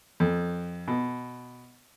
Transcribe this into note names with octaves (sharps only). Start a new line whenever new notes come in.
F2
B2